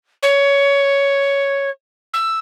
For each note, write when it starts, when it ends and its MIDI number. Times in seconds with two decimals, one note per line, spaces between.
0.22 1.69 73
2.13 2.39 88